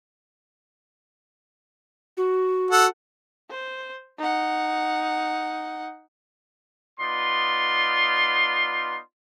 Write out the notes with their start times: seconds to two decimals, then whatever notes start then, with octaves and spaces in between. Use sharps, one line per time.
2.17 F#4
2.71 A4 F#5
3.50 C5
4.19 D#4 F#5
7.00 B3 D#4 F4 D5 C6